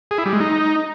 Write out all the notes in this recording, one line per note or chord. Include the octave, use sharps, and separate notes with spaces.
G#4
E4
G3
G#3
D#4